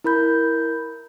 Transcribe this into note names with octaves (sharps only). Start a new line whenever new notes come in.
E4 A#4 B5 G6